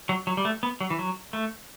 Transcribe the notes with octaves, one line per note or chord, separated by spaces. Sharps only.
F#3
F#3
G3
A3
B3
F#3
E3
F#3
A3